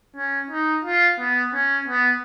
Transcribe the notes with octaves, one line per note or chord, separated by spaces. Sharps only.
C#4
D#4
F4
B3
C#4
B3